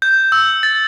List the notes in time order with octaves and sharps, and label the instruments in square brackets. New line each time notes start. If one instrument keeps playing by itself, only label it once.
[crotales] G6
E6
A6